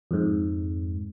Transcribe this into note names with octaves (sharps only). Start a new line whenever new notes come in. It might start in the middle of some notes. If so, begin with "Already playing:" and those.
F2 G#2